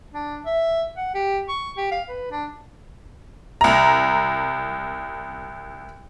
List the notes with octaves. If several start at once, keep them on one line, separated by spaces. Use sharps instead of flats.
D4
E5
F#5
G4
C#6
G4
F5
B4
D4
C2 A#5